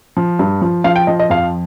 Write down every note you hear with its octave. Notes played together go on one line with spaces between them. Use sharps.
F3
G2
F3
F3 F5
G5
F3 D#5
D#5
F2 F5